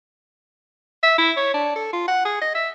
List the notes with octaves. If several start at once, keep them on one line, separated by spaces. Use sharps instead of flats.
E5
E4
C#5
D4
A4
F4
F#5
G#4
D#5
E5